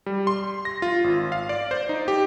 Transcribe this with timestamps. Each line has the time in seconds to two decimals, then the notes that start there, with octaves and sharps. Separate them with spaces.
0.06 G3
0.27 C6
0.65 A#6
0.82 F4
1.04 G#1
1.32 F5
1.49 D5
1.71 C5
1.89 D#4
2.08 G4